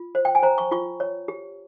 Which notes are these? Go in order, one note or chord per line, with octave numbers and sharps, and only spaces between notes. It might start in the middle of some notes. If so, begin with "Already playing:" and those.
Already playing: F4
C5
G5
G#5
C5 A#5
C#6
F4 C#6
C#5
G4